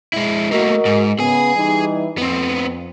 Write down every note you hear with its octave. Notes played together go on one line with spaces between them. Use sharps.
G#3 E4
A3 A#3 F#4 A#4 D#5
G#2
C#3 B3 G#4 G#5
E3 G3 D#4
F2 B3 C4